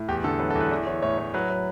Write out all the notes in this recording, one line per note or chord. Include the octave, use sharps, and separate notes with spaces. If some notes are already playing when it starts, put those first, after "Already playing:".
Already playing: A2
E2 G4
D3 A4
F#3 B4
A4
E2
B4
E3 D5
E3 C#5
A2 C#5
A2 C#5
F#3 B4
F#3